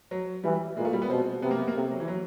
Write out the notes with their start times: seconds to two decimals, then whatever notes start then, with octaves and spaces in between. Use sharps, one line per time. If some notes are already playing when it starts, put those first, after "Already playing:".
0.11 F#3
0.44 E3 G3
0.77 A#2 G#3
0.85 A3
0.93 G3
1.02 B3
1.10 B2 C4
1.42 C3 B3
1.51 A#3
1.59 B3
1.67 A#3
1.75 C3 A3
1.92 F#3
2.00 E3
2.08 F#3